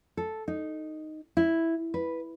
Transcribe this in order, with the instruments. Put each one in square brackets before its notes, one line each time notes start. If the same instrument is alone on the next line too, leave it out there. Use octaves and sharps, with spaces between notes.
[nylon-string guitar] A4
D#4
E4
B4